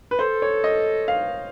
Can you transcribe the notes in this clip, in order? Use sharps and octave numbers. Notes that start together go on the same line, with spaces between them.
B4
A4 C5
C#5
D#5
F5